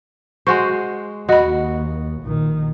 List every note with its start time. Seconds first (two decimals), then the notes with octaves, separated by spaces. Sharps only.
0.47 G#3 F#4 C5 C#6
1.29 D#2 F#4 D#5 B5
2.22 A#1 D#3